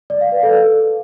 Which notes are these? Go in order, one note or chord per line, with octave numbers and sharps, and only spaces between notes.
D5
F5
B4
A4